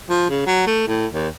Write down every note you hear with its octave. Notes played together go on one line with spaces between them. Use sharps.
F3
C#3
F#3
A3
A2
D#2